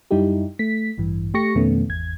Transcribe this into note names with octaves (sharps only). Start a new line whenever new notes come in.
F#2 G3 D#4 E4 G4
A3 B6
A1 G2 E3
A3 G4 C#6 A#6 C#7
F2 B2 D#3 A3 B3 C#4
G#1 E2 G#6